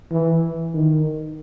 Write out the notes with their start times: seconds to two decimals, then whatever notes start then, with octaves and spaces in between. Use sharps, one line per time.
0.12 E3
0.74 D#3